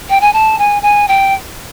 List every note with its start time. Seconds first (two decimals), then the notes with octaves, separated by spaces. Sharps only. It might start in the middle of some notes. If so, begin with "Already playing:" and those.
0.09 G5
0.21 G#5
0.33 A5
0.58 G#5
0.82 G#5
1.08 G5